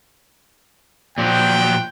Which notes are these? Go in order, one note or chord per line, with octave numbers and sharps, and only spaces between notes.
A#2 F3 F#3 G5